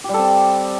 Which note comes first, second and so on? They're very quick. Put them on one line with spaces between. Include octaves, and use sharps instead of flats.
G4 G3 A4 C4